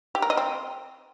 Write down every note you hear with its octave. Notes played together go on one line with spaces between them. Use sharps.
G4
A#4
D#5
C4